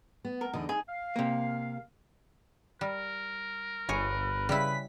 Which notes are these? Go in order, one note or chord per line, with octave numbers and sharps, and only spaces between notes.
B3
A#4
E2 D3 D#4 D#5
D#4 G#4
F5
C3 A#3
G3 A#4
G1 G#4 B4 C#5
C#3 G3 E4 B4 B6